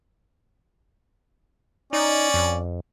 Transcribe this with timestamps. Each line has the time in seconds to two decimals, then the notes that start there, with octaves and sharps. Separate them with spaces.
1.93 C#4 D#4 D5
2.34 F2